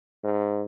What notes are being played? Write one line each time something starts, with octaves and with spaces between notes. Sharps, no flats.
G#2